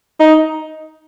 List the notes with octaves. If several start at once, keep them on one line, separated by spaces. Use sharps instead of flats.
D#4